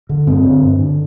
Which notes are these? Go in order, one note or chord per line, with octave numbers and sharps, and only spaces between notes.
D3
G2 C4
D3
G2
D3